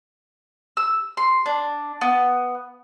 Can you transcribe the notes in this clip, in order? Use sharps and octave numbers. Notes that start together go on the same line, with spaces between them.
E6
C6
D4
B3